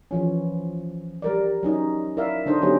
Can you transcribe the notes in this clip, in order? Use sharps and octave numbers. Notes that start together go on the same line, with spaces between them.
E3 F3 C#4
G3 A#4 D5
F#3 C#4 D#4
E4 A#4 D5 E5 F5
D3 D4 D#4 C5 D#5
D3 F#3 B3 C#4 G4